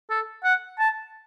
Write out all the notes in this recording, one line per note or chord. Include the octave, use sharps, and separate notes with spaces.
A4
F#5
A5